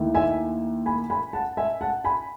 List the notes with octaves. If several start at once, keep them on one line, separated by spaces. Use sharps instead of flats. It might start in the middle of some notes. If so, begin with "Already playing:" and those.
Already playing: D#2 D#3 A3 E4
E5 G#5
G#5 B5
G#5 B5
F#5 A5
E5 G#5
F#5 A5
G#5 B5